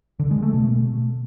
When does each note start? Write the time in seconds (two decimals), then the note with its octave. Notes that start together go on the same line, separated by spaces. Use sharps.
0.19 D3
0.31 G#3
0.42 A3
0.54 B2